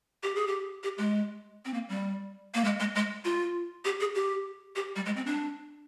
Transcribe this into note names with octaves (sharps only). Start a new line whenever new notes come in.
G4
G#4
G4
G4
G#3
C4
A#3
G3
A#3
G#3
G#3
G#3
F4
G4
G#4
G4
G4
G3
G#3
C4
D4